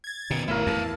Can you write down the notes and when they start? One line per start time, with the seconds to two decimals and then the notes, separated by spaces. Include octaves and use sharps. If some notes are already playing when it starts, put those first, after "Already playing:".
0.04 G#6 A6
0.31 B2 D#3 C#4
0.48 G#1 A2 A3 E4 A#4 F5
0.67 E2 A5